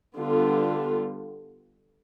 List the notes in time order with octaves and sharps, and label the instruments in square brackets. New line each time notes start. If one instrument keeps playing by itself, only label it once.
[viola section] D3 G3 B3 F4